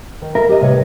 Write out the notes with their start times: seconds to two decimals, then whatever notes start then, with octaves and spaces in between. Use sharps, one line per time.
0.22 D#3
0.35 A#4 E5
0.49 G4 D#5
0.61 C2 A2 B4 C#5